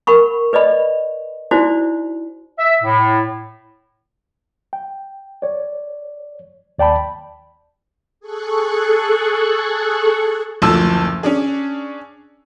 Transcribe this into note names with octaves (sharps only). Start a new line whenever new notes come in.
A#4 F#5 B5 C#6
B4 D5 D#5 B5
D#4 E4 F#4 C5 D5
E5
A2
G5
C#5 D5
D#2 D5 G5 A5 B5
G#4 A4 C#6 F#6
F#1 D2 F3 A5 E6
C#4 D4 G#4